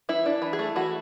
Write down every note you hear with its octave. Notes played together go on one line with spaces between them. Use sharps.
E3 E4
D4
E3
G#4
A3
E3 F#4